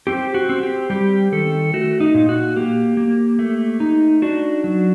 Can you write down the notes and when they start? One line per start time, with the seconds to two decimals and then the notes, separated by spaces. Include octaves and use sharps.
0.07 C4 G4
0.34 F#4
0.49 C4
0.63 G4
0.90 G3 G4
1.32 D#3 A4
1.73 A3 F#4
2.00 D#4
2.14 A#2
2.29 F#4
2.56 A#3 G4
2.97 A#3
3.39 A3
3.80 D#4
4.22 D4 F#4
4.64 F#3